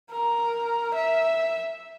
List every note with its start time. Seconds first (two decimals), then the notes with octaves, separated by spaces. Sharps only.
0.10 A#4
0.94 E5